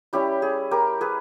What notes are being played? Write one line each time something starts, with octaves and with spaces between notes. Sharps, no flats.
G3 C#4 E4 G4
G#4
G4 A#4
G#4 B4